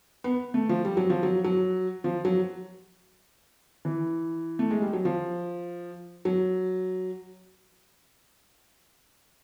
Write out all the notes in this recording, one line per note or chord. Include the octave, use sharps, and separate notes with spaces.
B3
A3
F3
G3
F#3
F3
F#3
F#3
F3
F#3
E3
A3
G#3
G3
F#3
F3
F#3